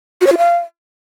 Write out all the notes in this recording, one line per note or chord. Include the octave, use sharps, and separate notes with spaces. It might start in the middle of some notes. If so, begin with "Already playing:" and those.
F#4
C#5
F4
F5